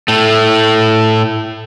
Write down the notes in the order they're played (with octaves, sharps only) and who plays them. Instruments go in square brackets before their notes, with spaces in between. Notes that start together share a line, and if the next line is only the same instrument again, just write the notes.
[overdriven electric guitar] A2 A3